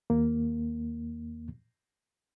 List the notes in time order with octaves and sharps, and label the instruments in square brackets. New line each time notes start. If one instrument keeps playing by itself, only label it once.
[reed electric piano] D#2 A#3